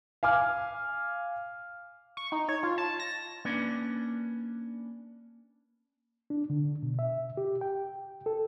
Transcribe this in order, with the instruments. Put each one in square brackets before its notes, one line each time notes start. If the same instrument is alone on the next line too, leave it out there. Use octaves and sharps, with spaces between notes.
[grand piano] F5 G#5 D6 F6
[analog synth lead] C#6
D#4
C#5
F4
A5
A#6
[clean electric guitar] A#3 C#4 D4 B4 D5
[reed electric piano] D4
D3
B2
E5
G4
G5
A4